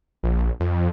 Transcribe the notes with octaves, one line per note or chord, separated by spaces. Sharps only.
A#1
F2